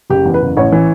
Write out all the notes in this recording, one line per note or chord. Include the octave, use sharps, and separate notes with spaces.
F#1 G4
E2
B4
F#1
A1 C#5
E3